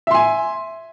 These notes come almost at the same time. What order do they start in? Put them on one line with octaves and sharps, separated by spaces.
E5 C6 G#5